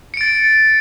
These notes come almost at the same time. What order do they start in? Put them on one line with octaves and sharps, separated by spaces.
C#7 D7 A6